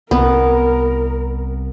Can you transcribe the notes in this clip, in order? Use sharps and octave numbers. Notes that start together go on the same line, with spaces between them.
C2 B3 A#4